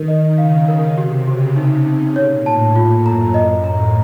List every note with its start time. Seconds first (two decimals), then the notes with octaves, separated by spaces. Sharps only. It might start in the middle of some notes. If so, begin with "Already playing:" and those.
Already playing: D#3 A#4
0.08 D#5
0.38 C#3 F5
0.67 C#3 A#4
0.97 C3 F#4
1.27 C#3 F#4
1.56 C3 D#4
1.86 D#4
2.16 A#2 C#5
2.46 A2 A5
2.76 F4
3.05 F#2 A#5
3.34 F#2 D#5
3.64 A2 A#5